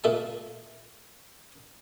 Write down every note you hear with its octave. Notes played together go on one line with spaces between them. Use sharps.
A#2 A4 E5 A5